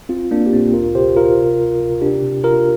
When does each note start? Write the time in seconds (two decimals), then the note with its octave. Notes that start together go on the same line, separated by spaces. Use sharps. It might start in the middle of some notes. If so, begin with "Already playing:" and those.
0.09 A#1 C4 F4
0.31 A#1 A#3 D4
0.46 G4
0.52 A#2 C4 F4
0.73 D2 F4 A#4
0.95 C3 G4 C5
1.16 C3 F4 A#4
1.38 C3
1.59 D2
1.81 C3
2.01 C3 D4 G4
2.22 C3
2.44 C3 F4 A#4